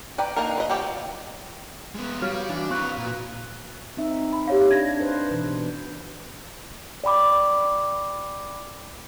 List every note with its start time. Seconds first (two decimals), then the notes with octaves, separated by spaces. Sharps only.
0.18 B4 D5 G5 A#5
0.36 A#3 D4 D#4 A#4
0.58 B4 D#5
0.70 F3 F#4 G4 D5 G5
1.95 G#3 B3
2.22 G3 F#4 C#5 F5
2.49 E3 D4
2.71 C4 B4 C#6 F#6
2.98 A#2
3.97 C4 D#4 E5
4.33 B5
4.48 G4 C#5 F5
4.71 D4 G#6 A#6
5.00 B4 C5
5.29 B2 E3 B4
7.04 D5 G5 B5 D6